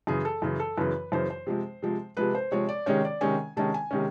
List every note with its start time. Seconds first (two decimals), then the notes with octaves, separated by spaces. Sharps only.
0.07 F#2 C#3 E3 G#4
0.25 A4
0.42 F#2 C#3 E3
0.60 A4
0.77 F#2 C#3 E3 B4
1.12 F#2 C#3 E3 C5
1.30 C5
1.47 C3 F3 G#3
1.82 C3 F3 G#3
2.17 C3 F3 G#3 B4
2.35 C5
2.51 C3 F3 G#3 C#5
2.69 D5
2.86 C3 D#3 G#3 C#4 C#5
3.05 D5
3.21 C3 D#3 G#3 C#4 G#5
3.57 C3 D#3 G#3 C#4 A5
3.74 G#5
3.91 C3 D#3 G#3 C#4